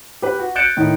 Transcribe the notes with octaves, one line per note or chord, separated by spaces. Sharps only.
G4 B4
F#4
F#6 G6 A6 C#7 D7 E7
A2 D#3